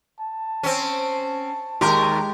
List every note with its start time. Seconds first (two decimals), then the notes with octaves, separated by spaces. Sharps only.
0.20 A5
0.63 C4 C#4
1.81 D#2 G#3 G4 A#4